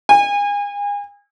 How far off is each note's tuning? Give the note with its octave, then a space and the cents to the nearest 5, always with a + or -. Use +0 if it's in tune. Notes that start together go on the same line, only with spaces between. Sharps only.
G#5 -35